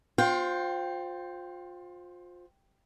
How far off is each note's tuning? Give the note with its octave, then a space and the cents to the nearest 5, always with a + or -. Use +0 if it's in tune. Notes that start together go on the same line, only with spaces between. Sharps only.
F4 +30 C5 +0 G5 +0